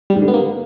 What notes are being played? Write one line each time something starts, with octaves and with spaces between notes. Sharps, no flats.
G3
G#2
D3
B3
A#3